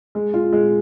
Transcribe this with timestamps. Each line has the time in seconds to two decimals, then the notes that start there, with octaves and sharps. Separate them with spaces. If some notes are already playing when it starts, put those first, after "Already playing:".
0.15 G#3
0.34 F4
0.53 G#3